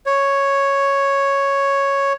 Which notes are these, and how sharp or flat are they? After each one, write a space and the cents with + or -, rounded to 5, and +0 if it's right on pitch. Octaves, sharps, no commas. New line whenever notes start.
C#5 +0